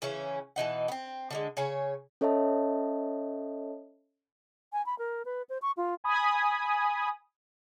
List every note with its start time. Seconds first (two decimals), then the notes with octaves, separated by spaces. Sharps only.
0.02 C#3 E3 C#4
0.56 B2 E3 D#4 F#5
0.88 B3 C4
1.30 D3 G3 G#3
1.57 C#3 C#5 G#5
2.21 C#4 A4 C#5 D#5 E5 A5
4.73 G#5
4.86 B5
4.99 A#4
5.25 B4
5.49 C5
5.62 C#6
5.77 F4
6.04 G#5 B5 D#6